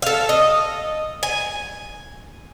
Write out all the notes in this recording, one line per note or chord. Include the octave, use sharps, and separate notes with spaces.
A4 F5
D#5
G#5